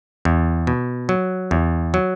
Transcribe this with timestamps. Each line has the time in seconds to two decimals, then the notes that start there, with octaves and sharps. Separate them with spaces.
0.25 E2
0.67 B2
1.09 F#3
1.51 E2
1.94 F#3